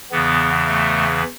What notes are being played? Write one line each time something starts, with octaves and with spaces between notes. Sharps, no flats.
E2 C#3 E3 B3
A3